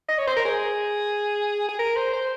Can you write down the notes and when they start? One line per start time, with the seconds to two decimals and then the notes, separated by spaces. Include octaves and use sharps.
0.08 D#5
0.18 C#5
0.27 C5
0.36 A#4
0.45 G#4
1.68 G#4
1.79 A#4
1.96 C5
2.13 C5